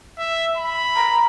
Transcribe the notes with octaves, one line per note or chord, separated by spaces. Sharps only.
E5
B5
A#5